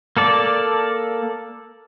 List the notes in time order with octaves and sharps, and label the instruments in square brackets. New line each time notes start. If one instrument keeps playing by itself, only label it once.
[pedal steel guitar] A#3 A4 D5